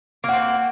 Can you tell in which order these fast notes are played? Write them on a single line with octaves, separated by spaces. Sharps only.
A#3 F#4 C4